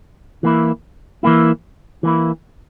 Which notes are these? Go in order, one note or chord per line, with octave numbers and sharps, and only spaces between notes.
E3 A#3 E4
E3 A#3 E4
E3 A#3 E4